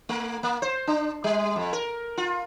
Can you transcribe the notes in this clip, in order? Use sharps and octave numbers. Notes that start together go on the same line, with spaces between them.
A3
A#3
C5
D4
G3
F2
A#4
F4